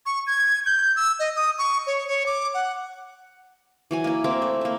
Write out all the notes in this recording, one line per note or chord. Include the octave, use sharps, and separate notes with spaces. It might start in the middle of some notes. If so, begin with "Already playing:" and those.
C#6
G#6
G6
E6
D#5
D#6
C#6
C#5
C#5
D6
F#5
E3 F#3 G#5
A#3 E4
A#3 C4 E5 D6
A3
A#3 E5